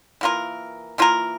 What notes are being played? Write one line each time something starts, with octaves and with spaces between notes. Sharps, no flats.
E3 A#3 F4 A#4
E3 A#3 F4 A#4